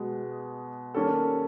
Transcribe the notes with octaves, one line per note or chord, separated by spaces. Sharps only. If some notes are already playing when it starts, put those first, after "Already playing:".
Already playing: B2 G#3 B3
D#3 G3 A#3 C#4 A4